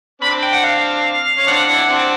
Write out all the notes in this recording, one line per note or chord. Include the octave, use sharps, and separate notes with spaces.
C4 D4 B5
G5
F#5
F5
C#4
C4 D4 F#5
D4 E4
C4 D4